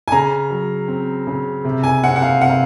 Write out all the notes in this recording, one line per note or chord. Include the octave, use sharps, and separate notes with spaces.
G#5
C#3 A#5
F#3
C4
C#3
C3
G#5
C4 F#5
F#5
F5
C3 F#5
F5